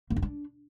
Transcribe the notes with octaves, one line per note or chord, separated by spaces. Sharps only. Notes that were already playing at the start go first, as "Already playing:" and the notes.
A#3
D#4
D4